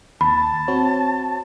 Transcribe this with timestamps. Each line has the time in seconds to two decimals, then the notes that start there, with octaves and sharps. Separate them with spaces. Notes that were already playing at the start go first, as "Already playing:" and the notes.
0.21 D#2 A5 B5
0.68 C4 F#4 C#5